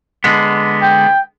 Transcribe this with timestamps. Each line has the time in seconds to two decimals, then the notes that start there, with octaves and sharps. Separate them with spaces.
0.24 D3 G#3 B3
0.82 G5